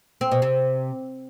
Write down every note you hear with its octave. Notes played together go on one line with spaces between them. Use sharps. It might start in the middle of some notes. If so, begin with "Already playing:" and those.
C4
B2
C3